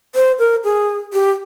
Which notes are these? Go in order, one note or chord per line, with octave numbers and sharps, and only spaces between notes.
C5
A#4
G#4
G4